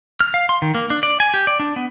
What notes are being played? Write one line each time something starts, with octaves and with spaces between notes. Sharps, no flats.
F6
F5
C6
D#3
A#3
D4
D5
G#5
G4
D5
D4
B3